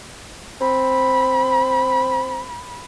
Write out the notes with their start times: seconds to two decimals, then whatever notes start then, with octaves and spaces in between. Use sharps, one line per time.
0.61 C4 B5